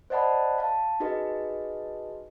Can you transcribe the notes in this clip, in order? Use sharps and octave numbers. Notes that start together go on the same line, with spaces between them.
C5 D5 D#5 F#5 A5 B5
F5 A5
D#4 F#4 G#4 B4 D#5